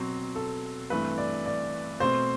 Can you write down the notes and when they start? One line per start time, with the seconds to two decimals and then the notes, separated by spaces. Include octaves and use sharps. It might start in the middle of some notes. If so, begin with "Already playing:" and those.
Already playing: B2 F#3 C4
0.35 A4
0.90 G2 E3 A3 C4 B4
1.18 D5
1.46 D5
2.00 B2 A3 C4 C5